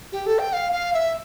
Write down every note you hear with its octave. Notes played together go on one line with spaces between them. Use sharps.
G4
A4
G5
F5
F5
E5